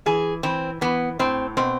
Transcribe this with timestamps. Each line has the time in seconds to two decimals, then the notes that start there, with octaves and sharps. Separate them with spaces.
0.06 E3 G#4
0.43 E3 C4
0.81 E3 B3
1.19 A2 C4
1.57 B2 C4